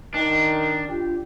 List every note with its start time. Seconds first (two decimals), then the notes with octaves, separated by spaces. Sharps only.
0.14 D#3 D4
0.87 D4 F4 G4